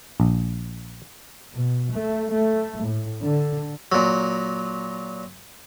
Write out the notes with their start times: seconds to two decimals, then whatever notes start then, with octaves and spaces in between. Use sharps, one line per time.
0.20 A#1
1.55 B2
1.94 A3
2.31 A3
2.86 A2
3.22 D3
3.92 A#2 F#3